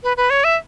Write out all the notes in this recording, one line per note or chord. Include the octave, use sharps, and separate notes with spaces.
B4
B4
C#5
E5